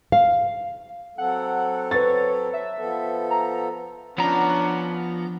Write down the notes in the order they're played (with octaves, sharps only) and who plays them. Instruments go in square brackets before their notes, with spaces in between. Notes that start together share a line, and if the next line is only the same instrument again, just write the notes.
[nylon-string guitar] F5
[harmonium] F#3 C4 A4 [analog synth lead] F#5
[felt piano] B4 A6 [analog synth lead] C#5
[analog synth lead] E5
[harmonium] F3 B3 A4
[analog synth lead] A#5
[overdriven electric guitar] F3 [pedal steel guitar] B3 A#5 [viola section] C#4 D4 F#5